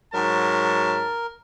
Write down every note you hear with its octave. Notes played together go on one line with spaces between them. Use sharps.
G#2 F#3 A#4 A5